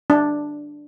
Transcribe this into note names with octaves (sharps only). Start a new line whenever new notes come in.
D4